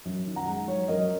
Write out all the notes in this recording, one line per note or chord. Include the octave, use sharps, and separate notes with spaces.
F#2
D#3
F#5 A#5
G#3
F#3 C#5
F#2 A#4 D#5